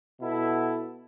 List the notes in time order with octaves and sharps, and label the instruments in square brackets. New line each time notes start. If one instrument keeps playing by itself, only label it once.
[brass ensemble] B2 B3 E4 A4